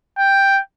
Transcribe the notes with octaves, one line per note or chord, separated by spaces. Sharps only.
G5